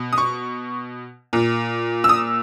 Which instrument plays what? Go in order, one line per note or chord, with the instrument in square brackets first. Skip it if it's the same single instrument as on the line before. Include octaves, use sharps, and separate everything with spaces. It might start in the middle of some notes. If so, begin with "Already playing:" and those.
Already playing: [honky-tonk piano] B2
D#6
C#6
A#2
E6
D#6